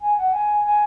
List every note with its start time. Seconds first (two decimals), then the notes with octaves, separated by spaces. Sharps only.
0.02 G#5
0.17 F#5
0.33 G#5
0.65 G#5